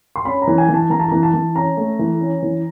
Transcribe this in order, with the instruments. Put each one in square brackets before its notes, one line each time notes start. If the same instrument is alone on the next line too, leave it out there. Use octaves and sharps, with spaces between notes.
[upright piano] C6
C#4 B5
A#5
E3
G#5
E3
A5
E3 A#5
A5
E3 A#5
A5
E3
C#4 A#5
A3
E3
C#4
E3